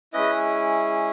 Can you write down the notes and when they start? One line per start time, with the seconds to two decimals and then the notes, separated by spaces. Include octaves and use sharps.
0.13 G#3 C#4 E4 B4 D#5